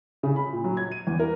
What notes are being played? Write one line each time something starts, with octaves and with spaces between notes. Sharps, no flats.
C#3
B5
A#2
F#3
G#6
D#7
E2
A#4